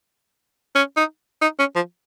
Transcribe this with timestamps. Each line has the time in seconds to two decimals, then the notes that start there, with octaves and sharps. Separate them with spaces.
0.75 C#4
0.97 D#4
1.42 D#4
1.59 C#4
1.75 F3